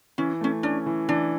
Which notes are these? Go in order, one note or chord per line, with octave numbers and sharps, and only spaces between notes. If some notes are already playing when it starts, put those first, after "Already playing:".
E3 C#4
A3 C#4
C#4 D4
E3
E3 D4